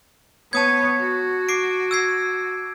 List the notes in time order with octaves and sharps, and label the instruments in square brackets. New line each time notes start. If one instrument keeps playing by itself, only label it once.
[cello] B3 C#5 [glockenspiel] A5 D#6 G#6
[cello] F#4
[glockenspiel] D6 C7 D7
E6 G#6 C7